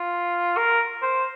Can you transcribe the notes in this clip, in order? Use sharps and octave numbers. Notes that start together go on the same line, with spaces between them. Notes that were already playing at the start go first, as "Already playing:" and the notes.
Already playing: F4
A#4
C5